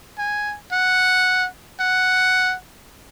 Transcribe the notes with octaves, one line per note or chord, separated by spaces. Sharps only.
G#5
F#5
F#5